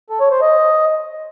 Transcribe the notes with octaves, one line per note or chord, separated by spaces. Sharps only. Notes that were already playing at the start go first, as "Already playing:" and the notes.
A4
C#5
C5
D#5